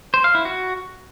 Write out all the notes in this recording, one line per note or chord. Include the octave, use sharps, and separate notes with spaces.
C5
F5
E4
F#4